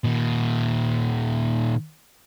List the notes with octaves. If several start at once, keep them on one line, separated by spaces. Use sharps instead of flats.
A#2 D#3